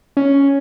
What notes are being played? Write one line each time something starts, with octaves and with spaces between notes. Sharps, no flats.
C#4